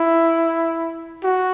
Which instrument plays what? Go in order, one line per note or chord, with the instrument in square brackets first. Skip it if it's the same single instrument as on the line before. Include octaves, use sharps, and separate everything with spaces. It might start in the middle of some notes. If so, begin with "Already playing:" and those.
Already playing: [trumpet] E4
F#4